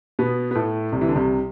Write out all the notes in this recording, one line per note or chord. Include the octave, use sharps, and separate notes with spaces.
B2 B3
B3
A2 A3
C2 C3
E3
D3
C2 C3